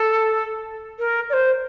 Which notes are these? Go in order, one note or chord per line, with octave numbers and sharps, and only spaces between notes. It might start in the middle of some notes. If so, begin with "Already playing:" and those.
Already playing: A4
A#4
D5
C5